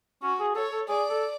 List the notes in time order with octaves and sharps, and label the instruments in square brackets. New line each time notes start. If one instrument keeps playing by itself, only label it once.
[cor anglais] C#4 [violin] F#4
[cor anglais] G#4
[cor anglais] A4 [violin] C#5
[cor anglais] A4
[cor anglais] G#4 [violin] D5
[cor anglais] A4